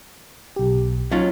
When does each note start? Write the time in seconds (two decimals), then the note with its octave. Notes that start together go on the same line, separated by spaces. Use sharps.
0.56 B1 G4
1.12 F#3 C#4 D#4 F4